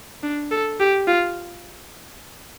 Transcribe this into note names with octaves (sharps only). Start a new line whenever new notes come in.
D4
A4
G4
F4